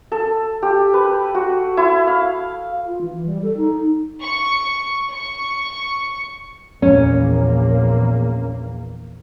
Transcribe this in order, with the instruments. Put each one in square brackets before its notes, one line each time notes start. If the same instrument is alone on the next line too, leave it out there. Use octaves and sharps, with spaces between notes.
[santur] A4
G4
B4
F#4
E4
F5
[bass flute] F4
E3
G3
A4
D#4
[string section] C#6
C#6
[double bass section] A#1 E2 A#3 [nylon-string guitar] C#4